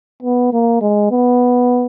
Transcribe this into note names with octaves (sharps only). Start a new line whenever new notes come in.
B3
A#3
G#3
B3